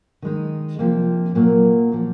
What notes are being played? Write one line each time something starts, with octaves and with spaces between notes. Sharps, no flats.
D#3 G#3 D#4
C3 F3 A#3
A#2 F#3 A#3
F3 A#3